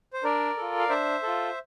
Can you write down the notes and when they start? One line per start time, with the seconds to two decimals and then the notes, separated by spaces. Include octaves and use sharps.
0.13 C5
0.24 D4 A#4 D5
0.57 F4 A4
0.79 F5
0.89 D4 C5 E5
1.23 F4 A4